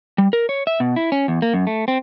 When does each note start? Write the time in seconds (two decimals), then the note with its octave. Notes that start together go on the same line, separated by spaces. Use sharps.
0.18 G3
0.33 A#4
0.49 C#5
0.67 E5
0.80 B2
0.96 E4
1.12 C#4
1.28 E2
1.42 A#3
1.54 F#2
1.67 A3
1.88 C4